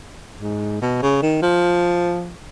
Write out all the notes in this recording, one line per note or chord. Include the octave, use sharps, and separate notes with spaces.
G#2
B2
C#3
D#3
F3